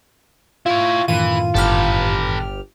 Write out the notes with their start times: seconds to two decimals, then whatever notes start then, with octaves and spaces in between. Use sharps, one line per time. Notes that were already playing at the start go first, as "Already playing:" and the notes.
0.66 E4 F4 C#5
1.08 F#2 A2 D#3 E3 F4 D#7
1.54 G1 G4 A4 B4 F6